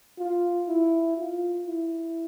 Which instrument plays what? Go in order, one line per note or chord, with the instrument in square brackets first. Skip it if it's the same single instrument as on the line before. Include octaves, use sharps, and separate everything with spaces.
[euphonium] F4
E4
F4
E4